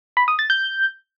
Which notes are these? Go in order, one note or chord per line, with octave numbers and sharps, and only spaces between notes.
B5
D#6
A6
G6